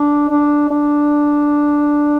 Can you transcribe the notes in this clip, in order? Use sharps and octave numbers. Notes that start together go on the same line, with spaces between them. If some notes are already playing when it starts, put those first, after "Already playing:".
Already playing: D4
D4
D4